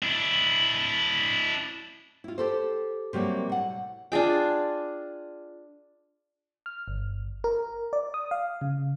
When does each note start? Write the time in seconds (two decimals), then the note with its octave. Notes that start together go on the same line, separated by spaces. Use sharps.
0.03 D4 E4
2.24 E4 F4
2.38 G4 A4 C5
3.13 C3 F#3 G3 A#3
3.49 A2 F#5
4.12 D4 F4 G#4 G5
6.66 F6
6.88 G1
7.44 A#4
7.93 D5
8.14 D#6
8.31 F5
8.61 C#3